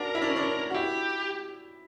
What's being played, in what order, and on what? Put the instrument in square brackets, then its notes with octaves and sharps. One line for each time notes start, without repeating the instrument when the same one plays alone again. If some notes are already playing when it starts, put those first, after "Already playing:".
Already playing: [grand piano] D4 F#4 [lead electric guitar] A#4
[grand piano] E4
D4
C#4
D4
F#4
[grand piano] E4 [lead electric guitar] G4